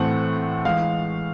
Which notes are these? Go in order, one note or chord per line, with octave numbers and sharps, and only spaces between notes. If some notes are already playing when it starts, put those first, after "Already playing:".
Already playing: A2 E3 A3 C4 F#5
E3 G#3 F5